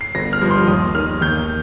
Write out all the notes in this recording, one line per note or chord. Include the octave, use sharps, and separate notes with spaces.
C7
G1 A#6
F6
G2 F3
C6
D#2 D#6
D#3 F6
D#2 G6